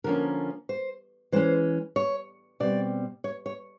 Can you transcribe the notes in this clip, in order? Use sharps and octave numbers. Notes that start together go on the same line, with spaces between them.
D3 F3 A#3 C#4 A#4
C5
E3 G#3 C#4 C5
C#5
B2 G3 C4 D5
C#5
C#5